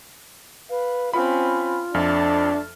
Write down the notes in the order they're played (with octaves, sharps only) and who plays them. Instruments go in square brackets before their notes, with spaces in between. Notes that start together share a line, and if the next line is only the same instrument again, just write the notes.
[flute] B4 [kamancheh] F5
[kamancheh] C4 C#4 [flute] F4 [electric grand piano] B5
[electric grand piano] F2 F6 [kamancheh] A3 A5 [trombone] D4